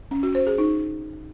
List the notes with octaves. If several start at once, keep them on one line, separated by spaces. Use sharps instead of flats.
C#4
F#4
C5
G#4
D#4